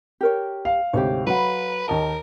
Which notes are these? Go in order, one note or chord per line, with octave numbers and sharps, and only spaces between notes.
G4 A#4 C#5
F5
D2 G#2 C3 G4 C5 C#5
F#3 B4 F#5 B5
D#2 A#4 D#5 A5